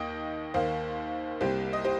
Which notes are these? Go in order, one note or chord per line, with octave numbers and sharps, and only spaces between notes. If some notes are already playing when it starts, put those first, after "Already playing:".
Already playing: D#2 D#3 A#3 D#5 G5
D#2 D#3 A#3 C5 F5
C2 C3 G3 A#3 G4 C5
D#5
G4 C5